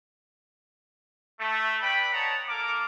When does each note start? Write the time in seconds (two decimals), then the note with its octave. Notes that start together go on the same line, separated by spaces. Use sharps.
1.40 A3
1.81 B4 D5 G5 B5
2.13 A4 C#5 D#5 F#5 A5 A#5
2.49 A#3 A4 A#4 D6